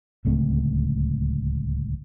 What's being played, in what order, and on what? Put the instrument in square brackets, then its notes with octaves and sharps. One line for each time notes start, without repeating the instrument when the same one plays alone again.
[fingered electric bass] D1 C#2 A3 C4